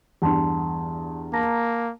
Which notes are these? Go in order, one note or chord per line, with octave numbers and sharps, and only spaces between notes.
E2 G2 F#5 A5 C6
A#3 A5 A#5 A#6